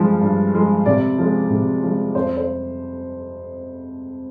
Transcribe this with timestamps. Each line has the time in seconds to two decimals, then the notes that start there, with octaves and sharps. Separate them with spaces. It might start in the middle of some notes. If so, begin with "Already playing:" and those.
Already playing: G2 F3 G#3
0.21 G2
0.54 F3 G#3
0.86 C3 D5
1.18 F3 G#3
1.50 C3
1.83 F3 G#3
2.15 F2 C5
2.37 C5